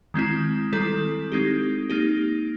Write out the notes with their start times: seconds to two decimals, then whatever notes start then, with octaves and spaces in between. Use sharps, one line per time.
0.14 D#3 G#3 C4 E4
0.72 D#3 G3 C4 E4 A4
1.32 G#3 C4 D#4 G4
1.90 A#3 D#4 G4